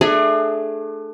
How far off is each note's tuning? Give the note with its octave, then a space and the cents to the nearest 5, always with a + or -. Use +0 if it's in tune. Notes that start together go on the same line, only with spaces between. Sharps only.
A3 +0 D4 +30 G#4 +0